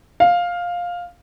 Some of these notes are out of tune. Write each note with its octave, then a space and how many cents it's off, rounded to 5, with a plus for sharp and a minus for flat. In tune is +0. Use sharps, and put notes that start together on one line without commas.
F5 +10